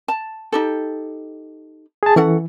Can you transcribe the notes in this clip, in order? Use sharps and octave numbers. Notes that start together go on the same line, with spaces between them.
A5
D#4 G4 A4
G#4 A5
E3 C#4 A4 F#5